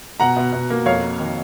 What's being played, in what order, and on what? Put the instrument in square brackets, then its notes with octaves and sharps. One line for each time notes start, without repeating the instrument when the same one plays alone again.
[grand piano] B2 F#5 A#5
B2
B2
A#3
F2 C#5 F5
A#3
D#3